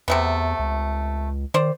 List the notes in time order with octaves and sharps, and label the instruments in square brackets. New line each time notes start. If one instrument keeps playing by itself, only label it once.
[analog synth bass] E2 [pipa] C3 A3 B3
[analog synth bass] C#2
[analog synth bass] D#3 [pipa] C5 D5